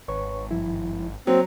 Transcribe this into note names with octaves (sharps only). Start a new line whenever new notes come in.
G#1 B4 C#5 C#6
G2 F3 E4
F#3 A#3 C4 F#4 C5